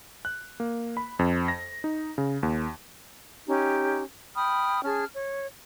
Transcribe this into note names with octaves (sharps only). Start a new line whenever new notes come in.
F#6
A#3
B5
F2
A#6
D#4
C#3
D#2
C#4 D#4 G4
G5 B5 D#6 F6
C#4 G#4 A5 F6
C#5